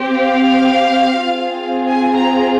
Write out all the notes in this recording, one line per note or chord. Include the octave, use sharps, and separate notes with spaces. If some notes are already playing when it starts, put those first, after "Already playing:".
Already playing: C4 G4
F5
C4 F4 G#4
G#5
A#5